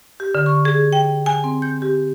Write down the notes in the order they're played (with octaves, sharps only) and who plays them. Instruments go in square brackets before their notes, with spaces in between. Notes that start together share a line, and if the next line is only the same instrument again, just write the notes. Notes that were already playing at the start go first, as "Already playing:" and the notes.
[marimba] G4
D3
C#6
G#4
G5
G#5
C4
G6
G4